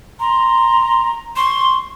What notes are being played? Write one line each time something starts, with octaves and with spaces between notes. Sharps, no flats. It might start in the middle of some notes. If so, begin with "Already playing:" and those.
A#5 C6
C6 C#6